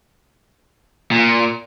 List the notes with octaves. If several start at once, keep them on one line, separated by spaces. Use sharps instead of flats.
A#2